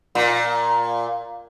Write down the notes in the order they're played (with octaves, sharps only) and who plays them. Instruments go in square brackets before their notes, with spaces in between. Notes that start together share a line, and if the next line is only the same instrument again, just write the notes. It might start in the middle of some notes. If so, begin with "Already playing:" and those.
[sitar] A#2